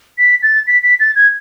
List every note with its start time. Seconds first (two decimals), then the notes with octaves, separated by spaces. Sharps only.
0.18 B6
0.42 A6
0.67 B6
0.83 B6
0.99 A6
1.15 G#6